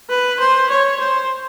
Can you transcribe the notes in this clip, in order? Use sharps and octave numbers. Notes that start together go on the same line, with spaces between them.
B4
C5
C#5
C5